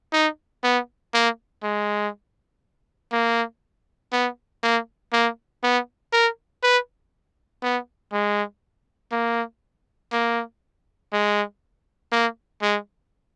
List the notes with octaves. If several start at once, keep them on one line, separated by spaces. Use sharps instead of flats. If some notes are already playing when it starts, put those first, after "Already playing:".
D#4
B3
A#3
G#3
A#3
B3
A#3
A#3
B3
A#4
B4
B3
G#3
A#3
A#3
G#3
A#3
G#3